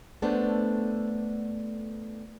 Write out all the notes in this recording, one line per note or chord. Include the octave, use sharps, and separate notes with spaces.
A3 B3 D4 A4 C5